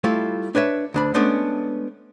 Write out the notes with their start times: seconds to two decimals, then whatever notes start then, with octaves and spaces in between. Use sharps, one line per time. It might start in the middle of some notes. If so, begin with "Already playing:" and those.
0.04 G3 A3 E4 F4
0.55 D4 B4 C#5 E5
0.94 D2 D4 B5
1.14 G#3 A3 B3 C#4 D4